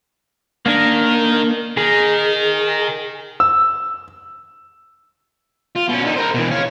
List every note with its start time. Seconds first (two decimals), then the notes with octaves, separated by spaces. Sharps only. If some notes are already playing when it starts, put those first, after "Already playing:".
0.66 D#3 A#3 D4
1.77 D#3 G#4
3.40 E6
5.76 F4
5.89 B2 C#4
6.04 D3 D#4
6.16 A#4 C5
6.34 B2 E3
6.51 C#5 F5